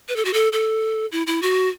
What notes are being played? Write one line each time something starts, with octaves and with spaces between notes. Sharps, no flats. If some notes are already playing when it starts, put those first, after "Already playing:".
B4
A4
F#4
A4
A4
E4
E4
F#4